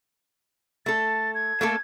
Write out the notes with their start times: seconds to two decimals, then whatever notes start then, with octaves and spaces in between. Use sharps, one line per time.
0.86 A3 A4 A6
1.35 G#6
1.61 A3 A#3 A4